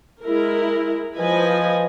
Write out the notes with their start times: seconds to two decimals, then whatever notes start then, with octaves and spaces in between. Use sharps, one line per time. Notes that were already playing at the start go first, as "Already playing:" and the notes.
0.23 G#3 E4 A#4
1.16 F3 B4 D#5 G#5